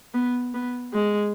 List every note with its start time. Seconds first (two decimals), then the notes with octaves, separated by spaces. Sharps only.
0.14 B3
0.54 B3
0.93 G#3